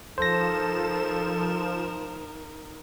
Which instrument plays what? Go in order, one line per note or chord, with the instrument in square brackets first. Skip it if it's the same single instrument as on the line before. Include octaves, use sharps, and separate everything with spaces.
[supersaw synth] F3 E7 [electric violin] D#4 A#4 [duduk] A4 [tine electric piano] C5 A#6